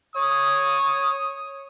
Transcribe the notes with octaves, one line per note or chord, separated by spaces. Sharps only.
C#5 D#6